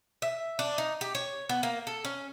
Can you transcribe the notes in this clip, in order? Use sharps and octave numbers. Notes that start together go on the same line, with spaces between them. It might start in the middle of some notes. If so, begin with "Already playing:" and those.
E5
D4
D#4
G4
C#5
B3
A#3
A4
C#4